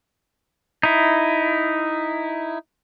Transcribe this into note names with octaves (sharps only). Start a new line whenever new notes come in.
D#4 E4